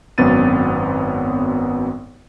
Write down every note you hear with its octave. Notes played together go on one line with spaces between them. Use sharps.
G#1 F#2 B3 C4 A6 D#7